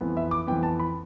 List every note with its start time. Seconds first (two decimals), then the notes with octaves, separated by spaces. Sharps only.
0.01 F2 E3 B3
0.17 E5
0.31 D6
0.47 F2 E3 B3 G5
0.63 A5
0.80 B5